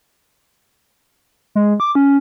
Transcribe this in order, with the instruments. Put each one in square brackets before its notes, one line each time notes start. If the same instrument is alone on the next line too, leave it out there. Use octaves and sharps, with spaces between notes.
[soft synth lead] G#3
D6
C#4